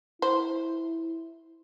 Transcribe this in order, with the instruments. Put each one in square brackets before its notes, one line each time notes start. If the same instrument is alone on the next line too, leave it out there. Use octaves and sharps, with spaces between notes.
[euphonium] E4 [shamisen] C5